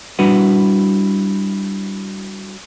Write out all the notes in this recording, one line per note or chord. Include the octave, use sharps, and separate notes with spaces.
G3 D4 E4 F#4 B4 F#5